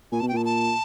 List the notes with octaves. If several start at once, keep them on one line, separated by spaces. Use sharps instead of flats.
A#2 G#5
B2 A5
G5
A#2 A5
A5